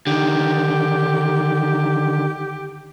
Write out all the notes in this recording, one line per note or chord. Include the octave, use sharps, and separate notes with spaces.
D3 D#3 G4